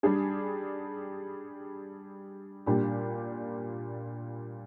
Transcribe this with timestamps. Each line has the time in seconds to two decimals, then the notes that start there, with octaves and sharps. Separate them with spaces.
0.03 G3 D4 G#4
2.66 A#2 G3 D4 G4